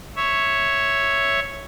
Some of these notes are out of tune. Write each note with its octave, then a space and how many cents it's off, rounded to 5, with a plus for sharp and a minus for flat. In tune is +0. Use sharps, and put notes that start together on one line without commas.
C#5 +0 E5 +0